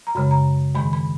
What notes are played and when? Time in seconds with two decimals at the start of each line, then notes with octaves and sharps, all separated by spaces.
0.07 A#5
0.15 F#2 C#3 G#3 B5
0.31 A#5
0.75 G#2 D#3 G#3 B5
0.93 B5